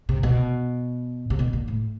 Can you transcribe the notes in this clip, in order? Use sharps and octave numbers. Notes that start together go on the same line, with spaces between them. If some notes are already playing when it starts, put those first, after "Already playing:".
C3
B2
C3
B2
A#2
A2